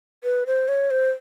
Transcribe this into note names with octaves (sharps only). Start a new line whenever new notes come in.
B4
C5
C#5
C5